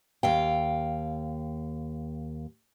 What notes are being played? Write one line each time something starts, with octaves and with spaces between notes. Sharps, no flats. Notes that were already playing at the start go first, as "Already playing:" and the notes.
D#2 F5 G5